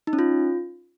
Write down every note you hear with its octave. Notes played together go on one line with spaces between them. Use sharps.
D#4
C#4
F4